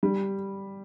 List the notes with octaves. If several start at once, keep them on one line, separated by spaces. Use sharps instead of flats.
G3